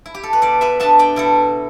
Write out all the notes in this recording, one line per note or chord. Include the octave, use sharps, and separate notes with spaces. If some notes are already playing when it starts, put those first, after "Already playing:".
E4
G4
A4
B4
B2 A4 D5
B4 E5
B3 D4 E5 A5
D5 G5
B2 E4 A4